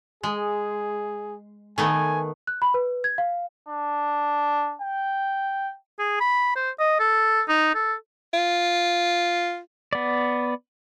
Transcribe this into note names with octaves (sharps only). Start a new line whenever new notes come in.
G#3 G#4
D#3 A3 B3 G#5
F#6
B5
B4
G#6
F5
D4
G5
G#4
B5
C5
D#5
A4
D#4
A4
F4
B3 D5